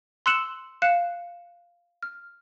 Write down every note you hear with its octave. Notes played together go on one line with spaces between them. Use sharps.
C6 E6 F#6 C#7 E7 F#7
F5 F#6 C#7 E7
F6